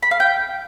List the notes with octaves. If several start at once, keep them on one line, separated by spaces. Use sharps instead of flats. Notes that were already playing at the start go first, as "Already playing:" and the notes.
B5
F5
G5